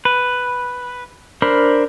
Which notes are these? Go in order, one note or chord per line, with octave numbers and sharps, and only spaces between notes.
B4
D4 A#4 C5 B5